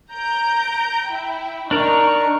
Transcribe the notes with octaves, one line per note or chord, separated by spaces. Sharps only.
A#5 G6 D7
E4 G5
D4 D#4 A#4 C#6